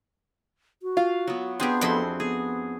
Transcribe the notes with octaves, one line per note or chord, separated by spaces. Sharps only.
F#4
F4 F5
F#3 B3
B3 C4 D4 G4 G#4
F2 C4 E4 F#4 C6
B3 G#4